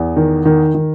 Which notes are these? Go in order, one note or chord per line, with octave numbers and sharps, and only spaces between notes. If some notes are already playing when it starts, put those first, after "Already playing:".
Already playing: E2
D#3
D#3
D#3